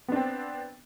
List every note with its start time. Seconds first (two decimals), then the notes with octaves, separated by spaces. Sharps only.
0.08 B3
0.12 D4
0.16 C4